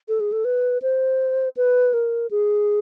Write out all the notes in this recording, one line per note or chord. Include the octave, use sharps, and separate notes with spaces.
A4
G#4
A4
B4
C5
B4
A#4
G#4